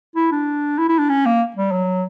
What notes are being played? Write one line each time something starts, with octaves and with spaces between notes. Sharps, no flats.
E4
D4
E4
E4
D4
C#4
A#3
G3
F#3